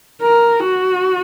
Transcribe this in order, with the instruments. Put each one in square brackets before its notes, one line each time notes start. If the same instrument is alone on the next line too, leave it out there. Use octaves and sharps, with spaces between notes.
[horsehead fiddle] A#4
F#4